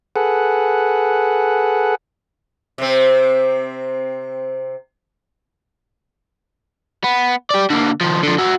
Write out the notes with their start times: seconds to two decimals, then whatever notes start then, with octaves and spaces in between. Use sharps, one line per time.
0.16 G#4 A4 B4 F#5
2.78 C3 C4
7.04 B3
7.50 G4 D5
7.70 D3 A#3
8.01 D#3 F3
8.23 D3 F3
8.39 F#4 E5